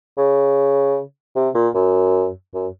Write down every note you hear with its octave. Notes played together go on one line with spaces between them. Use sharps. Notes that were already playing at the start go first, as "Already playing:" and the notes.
C#3
C3
A#2
F#2
F#2